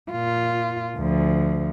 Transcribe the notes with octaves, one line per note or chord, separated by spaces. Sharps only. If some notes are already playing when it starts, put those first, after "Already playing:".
A#2 F4
D2 F3